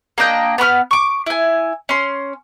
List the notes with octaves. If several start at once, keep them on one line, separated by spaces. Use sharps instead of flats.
A#3 D4 D#5 G5
B3 B5 C#6 F6
C#6 D6
E4 G#5
C#4 C6